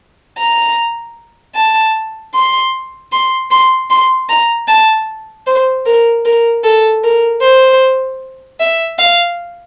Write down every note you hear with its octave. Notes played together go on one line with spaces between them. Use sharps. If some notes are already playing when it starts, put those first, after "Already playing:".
A#5
A5
C6
C6
C6
C6
A#5
A5
C5
A#4
A#4
A4
A#4
C5
E5
F5